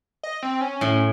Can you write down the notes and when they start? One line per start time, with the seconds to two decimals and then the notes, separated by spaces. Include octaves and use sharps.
0.23 D#5
0.43 C4
0.61 C#4
0.81 A2